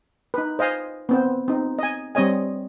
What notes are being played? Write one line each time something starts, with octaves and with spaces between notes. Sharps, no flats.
D#4 B4
C5 D#5 F5 G#5
B3 C4 C5
C4 D#4
D#5 G#5
G3 C4 C#5 D#5 G#5